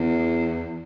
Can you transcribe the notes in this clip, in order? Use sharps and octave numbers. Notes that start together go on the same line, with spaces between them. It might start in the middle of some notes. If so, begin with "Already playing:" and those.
Already playing: E2